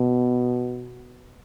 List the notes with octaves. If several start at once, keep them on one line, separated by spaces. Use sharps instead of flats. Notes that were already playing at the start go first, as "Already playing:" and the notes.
Already playing: B2